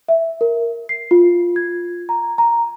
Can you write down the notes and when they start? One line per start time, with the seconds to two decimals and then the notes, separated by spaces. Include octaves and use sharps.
0.09 E5
0.41 A#4
0.89 C7
1.11 F4
1.56 G#6
2.09 A#5
2.38 A#5